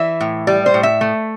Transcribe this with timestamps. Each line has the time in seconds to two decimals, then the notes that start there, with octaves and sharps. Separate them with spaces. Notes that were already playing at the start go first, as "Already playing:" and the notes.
Already playing: E3 E5
0.21 A2
0.47 G3 D5
0.66 C5
0.74 A2
0.83 E5
1.01 A3